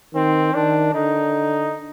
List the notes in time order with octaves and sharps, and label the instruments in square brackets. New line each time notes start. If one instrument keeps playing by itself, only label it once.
[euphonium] D#3 [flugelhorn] C4
[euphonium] D#3 [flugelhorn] D4
[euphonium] D3 [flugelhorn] D#4